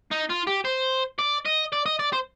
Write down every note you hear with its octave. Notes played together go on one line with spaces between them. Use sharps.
D#4
F4
G4
C5
D5
D#5
D5
D#5
D5
C5